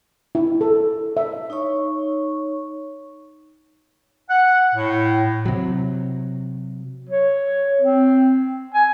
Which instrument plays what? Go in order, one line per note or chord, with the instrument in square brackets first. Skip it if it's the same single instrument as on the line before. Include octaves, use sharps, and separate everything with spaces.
[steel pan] E4
A4
E5
[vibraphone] D#4 C#5 C#6
[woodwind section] F#5
A2
[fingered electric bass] C3 F#3
[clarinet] C#5
C4
G#5